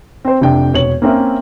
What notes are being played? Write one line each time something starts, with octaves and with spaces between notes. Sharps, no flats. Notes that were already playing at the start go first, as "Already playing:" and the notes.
C4 C5
F1 C3 D4 G5
E1 C#5 F#7
A#3 C4 C#4 A#4 E5